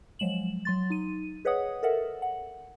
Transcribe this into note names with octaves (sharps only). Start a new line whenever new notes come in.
F3 F#3 G#3 E7 F#7
F#3 C6 A6
D#4 D#7
G#4 B4 C#5 D#5 F#5 D#6
A4 A#4 E5 F#5
F#5